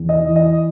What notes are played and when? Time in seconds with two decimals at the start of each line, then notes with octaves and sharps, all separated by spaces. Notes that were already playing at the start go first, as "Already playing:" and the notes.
Already playing: E2
0.09 D#5
0.22 E3
0.36 D#5